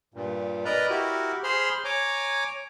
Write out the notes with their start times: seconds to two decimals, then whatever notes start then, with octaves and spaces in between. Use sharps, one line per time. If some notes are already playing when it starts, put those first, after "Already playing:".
0.14 G2 A#2
0.65 A#4 B4 D5 D#5 A#5
0.90 E4 F#4 G4 A#4
1.44 G#4 C5 B5 C6 F6
1.84 C#5 G#5 A#5 D6